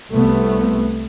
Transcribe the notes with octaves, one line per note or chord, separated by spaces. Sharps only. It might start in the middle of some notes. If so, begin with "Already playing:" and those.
C2 A3 B3